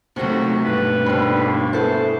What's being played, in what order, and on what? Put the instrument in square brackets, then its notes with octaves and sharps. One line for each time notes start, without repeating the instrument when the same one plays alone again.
[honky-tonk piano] D#2 [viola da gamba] C3 F#3 A3 [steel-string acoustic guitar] F3 F#4
[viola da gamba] G2 B2 [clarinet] B4
[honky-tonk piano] D#2 B5 [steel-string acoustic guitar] D3 F3
[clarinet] A#3
[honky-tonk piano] A3 B3 E4 [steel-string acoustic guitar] G#4 A4 A5 [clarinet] C5